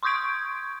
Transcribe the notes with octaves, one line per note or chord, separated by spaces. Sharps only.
C6 C#6 D#6 G6 G#6 D7